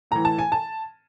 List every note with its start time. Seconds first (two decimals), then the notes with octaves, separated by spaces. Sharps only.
0.11 A2 E3 A#5
0.25 A5
0.39 G#5
0.52 A5